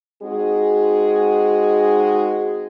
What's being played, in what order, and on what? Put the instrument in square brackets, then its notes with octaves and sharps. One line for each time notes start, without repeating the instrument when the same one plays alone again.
[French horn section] G#3 C4 D#4 F#4 G#4